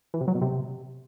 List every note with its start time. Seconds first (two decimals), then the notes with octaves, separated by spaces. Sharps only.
0.14 E3
0.21 C3
0.28 F#3
0.35 B2
0.42 C3